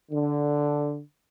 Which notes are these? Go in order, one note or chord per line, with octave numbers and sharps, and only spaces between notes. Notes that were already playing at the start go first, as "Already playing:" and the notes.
D3